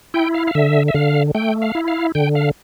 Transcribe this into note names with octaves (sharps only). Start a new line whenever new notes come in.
E4 G5
F5
F5
D3 E5
E5
D3 F5
A3 G5
F5
E4
F5
D3 G5
F5